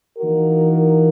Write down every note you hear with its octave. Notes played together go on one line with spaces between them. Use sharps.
E3 A#3 D#4 F#4 A#4